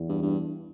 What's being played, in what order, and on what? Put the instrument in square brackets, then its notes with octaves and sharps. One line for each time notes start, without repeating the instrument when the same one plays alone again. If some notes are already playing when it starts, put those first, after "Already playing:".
Already playing: [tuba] E2
[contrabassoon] G2
G2